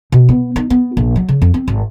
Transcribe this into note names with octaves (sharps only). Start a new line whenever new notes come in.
B2
B3
D#4
B3
A#1
F#3
C#3
F2
C4
G#1